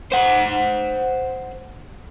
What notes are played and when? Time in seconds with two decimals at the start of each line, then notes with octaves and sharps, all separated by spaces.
0.12 C5 F#5